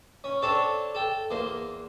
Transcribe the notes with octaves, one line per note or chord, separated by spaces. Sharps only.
C#4
C4 D4 A4 C#5 A5
A4 G5
E2 A#3 C5 C6